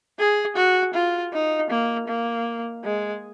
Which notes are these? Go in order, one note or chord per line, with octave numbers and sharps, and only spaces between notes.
G#4
F#4
F4
D#4
A#3
A#3
G#3